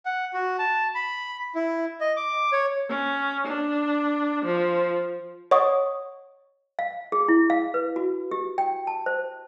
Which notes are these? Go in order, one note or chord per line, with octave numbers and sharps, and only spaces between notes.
F#5
F#4
A5
B5
E4
D#5
D6
C#5
C#4
D4
F3
C#5 D#5 F#5 C#6 D#6
F5
G#4
E4
F5
B4
F#4
G4
G5
A5
C5